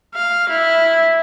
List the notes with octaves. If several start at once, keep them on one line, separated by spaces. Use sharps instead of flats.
F5
E4